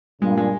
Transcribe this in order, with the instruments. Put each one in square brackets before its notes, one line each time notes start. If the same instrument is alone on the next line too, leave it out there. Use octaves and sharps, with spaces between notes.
[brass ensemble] G2 A#2 [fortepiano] G#3
[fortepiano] G#3